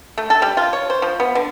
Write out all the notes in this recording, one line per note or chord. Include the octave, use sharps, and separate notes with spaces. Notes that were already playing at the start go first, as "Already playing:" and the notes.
A3
A4
G3
F4
C#5
C5
F3
B3
D3